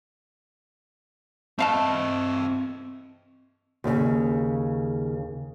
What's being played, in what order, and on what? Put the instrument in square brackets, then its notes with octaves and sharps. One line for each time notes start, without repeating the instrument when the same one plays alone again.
[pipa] A3 F5 A5 [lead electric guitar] C4 D#5
[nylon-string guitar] D#2 C#3